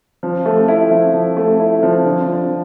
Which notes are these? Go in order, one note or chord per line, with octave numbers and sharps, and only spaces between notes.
F3
A3
E4
F3
F3
A3
E4
F3
D3
F3